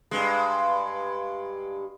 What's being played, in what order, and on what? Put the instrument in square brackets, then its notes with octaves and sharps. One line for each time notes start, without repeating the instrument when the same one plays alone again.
[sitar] G2 G#3